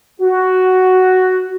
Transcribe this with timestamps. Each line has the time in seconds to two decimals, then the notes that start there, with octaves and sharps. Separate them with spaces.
0.21 F#4